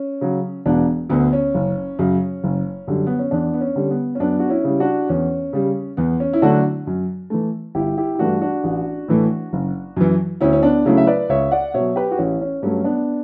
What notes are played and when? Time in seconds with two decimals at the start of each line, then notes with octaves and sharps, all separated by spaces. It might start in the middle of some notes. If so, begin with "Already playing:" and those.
Already playing: C#4
0.21 C#3 F#3
0.66 E1 B3 D4
1.09 D2 D3 B3
1.33 C#4
1.55 F#1
1.99 F#2 C#3
2.44 F#1
2.87 F#2 D3 G3
3.07 B3
3.19 C#4
3.31 E2 B3 D4
3.54 B3
3.61 C#4
3.75 D3 G3
3.91 B3
4.15 C#4
4.20 F#2 B3 D4
4.40 F#4
4.50 C#4 E4
4.64 C#3 G3
4.80 D4 F#4
5.09 E2 C#4
5.53 C#3 G3
5.97 E2 B3
6.20 C#4
6.33 E4
6.42 D3 F#3 A3 D4 F#4
6.87 F#2
7.30 E3 A3
7.75 G1 E4 G4
7.98 E4 G4
8.15 E4
8.19 G2 E3 A3 D4 F#4
8.41 D4 F#4
8.64 A1
9.08 A2 E3 A3
9.53 F#1
9.97 F#2 E3
10.41 D2 C#4 E4
10.53 C#4
10.63 B3 D4
10.85 C#3 F#3 A3 C#4 E4
10.97 E5
11.07 B4 D5
11.29 C#2 C#5 E5
11.51 D5 F#5
11.74 B2 F#3 C#5 E5
11.96 G4 B4
12.11 F#4
12.18 A1 C#4 E4
12.41 C#4
12.63 G2 F#3 A3 C#4
12.84 B3 D4